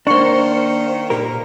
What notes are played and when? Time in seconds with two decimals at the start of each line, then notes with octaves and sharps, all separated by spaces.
0.07 D#3 A#3 D4 C5 C#6 C#7
1.10 A#2 A#3 G4 A#4